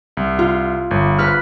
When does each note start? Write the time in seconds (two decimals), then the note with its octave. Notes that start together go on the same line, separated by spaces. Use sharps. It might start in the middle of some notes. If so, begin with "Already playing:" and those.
0.17 C2
0.39 F4
0.91 G1
1.18 B4 F6